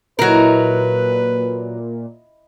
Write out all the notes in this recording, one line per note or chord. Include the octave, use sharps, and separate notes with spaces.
A#2 F#3 E4 A#4 B4 D#5 A5